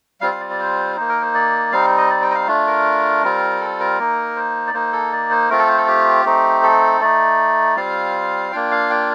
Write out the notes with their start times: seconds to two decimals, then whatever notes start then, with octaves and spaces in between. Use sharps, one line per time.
0.21 G3 C4 F4 F5
0.31 F5
0.40 D5
0.50 D5
0.59 C5
0.97 A#3 D#4 C5
1.09 A#4
1.21 C5
1.34 D5
1.72 G3 C4 D#4 F5
1.97 D#5
2.10 D5
2.22 G5
2.31 D#5
2.35 F5
2.47 A3 D4 F4
2.67 A#4
3.23 G3 C4 F4
3.61 A4
3.80 A#4
3.99 A#3 D#4
4.36 C5
4.67 D5
4.74 A#3 D#4 C5
4.93 A4
5.13 D5
5.31 C5
5.50 A3 C4 F4 A#4
5.59 A4
5.68 C5
5.78 A4
5.88 G4
6.25 A3 C4 D#4
6.63 A4
7.01 A3 D#4 D5
7.76 G3 C4 F4 F5
8.52 A#3 D4 F4 G5
8.71 F5
8.90 G5